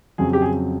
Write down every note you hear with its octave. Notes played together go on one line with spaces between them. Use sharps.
F2 C#3 F#3 G#4
G4
G#4